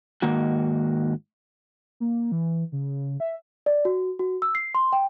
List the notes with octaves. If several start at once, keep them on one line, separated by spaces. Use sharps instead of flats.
G#2 D#3 A#3 F#4
A#3
E3
C#3
E5
D5
F#4
F#4
E6
C7
C6
G5